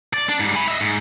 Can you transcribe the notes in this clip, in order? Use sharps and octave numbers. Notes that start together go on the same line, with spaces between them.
D5
D4
G#2 G3
G#5 B5
D#5 E5
G#2